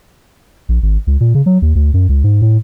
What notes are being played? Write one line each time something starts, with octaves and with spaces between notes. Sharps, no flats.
A#1
G#1
C#2
A#2
C#3
F#3
D#2
D2
F#2
C#2
G#2
A2